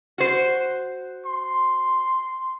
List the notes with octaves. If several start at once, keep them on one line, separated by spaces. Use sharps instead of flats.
F#4 C5
C6